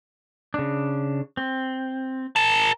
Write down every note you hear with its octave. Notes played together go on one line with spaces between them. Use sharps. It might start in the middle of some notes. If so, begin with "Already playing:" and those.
C#3 D4
C4
A#4 A5